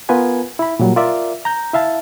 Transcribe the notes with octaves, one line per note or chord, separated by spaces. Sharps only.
B3 F4 A#4 B4 G#5
E4 B5
A#2 F#3 G3
F4 A#4 D5 E5
A#5 G6
E4 E5 F5 A5